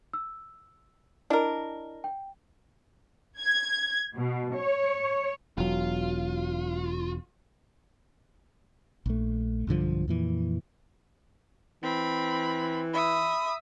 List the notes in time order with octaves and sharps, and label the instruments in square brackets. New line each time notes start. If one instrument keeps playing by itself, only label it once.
[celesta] E6
[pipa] D4 A#4 [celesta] E4 D#5
[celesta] G5
[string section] G#6
B2
C#5
[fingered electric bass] E1 F#3 [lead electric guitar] F4
[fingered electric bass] A#1 A3
B1 G2 D3 F3
F2 A#2 E3
[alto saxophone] E3 [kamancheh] C4 B5
[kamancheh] E5 D#6 [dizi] B5